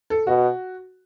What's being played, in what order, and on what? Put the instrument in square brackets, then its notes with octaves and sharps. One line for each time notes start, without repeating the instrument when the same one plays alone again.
[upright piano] A4
[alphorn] B2 [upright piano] F#4